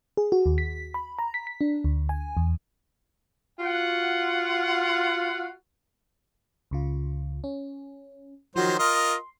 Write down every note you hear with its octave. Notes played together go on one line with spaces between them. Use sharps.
G#4
F#4
D#2
B6
B5
A#5
B6
B6
D4
D2
G#5
E2
F4 F#4 F#5
C#2 C#3 F4
C#4
D#3 F3 F#3 F#4 C5
F4 A#4 D#5 C6